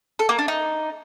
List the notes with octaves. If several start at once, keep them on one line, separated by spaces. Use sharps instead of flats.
A4
A#3
D4
D#4